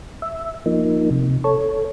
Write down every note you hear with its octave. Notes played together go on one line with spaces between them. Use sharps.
E5
F3 A#3 D#4
C3
A4 C#5